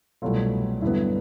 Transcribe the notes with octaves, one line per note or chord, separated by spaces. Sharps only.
C2 B2 F#3 A3 F4
G2 D3 F#3 B3 E4